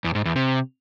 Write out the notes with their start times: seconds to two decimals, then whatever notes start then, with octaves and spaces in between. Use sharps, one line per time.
0.04 E2
0.15 G#2
0.25 E2
0.36 C3